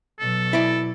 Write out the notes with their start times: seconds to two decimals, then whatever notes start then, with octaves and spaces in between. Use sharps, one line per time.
0.19 B2 F#3 A4
0.53 E4 D5